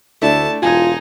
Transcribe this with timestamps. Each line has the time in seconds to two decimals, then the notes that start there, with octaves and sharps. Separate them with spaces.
0.22 D2 A3 D4 E4 A5
0.63 E1 D#4 F4 G#5 G#6